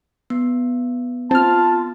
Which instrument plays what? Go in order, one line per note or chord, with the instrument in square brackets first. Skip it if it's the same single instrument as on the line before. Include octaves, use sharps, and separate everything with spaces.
[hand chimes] B3
[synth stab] C4 F6 [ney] F4 [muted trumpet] A5